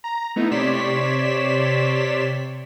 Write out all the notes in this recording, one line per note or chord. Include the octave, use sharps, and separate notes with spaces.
A#5
A3 B3 D#4 E4
C3 C#5 D5 C6 B6 E7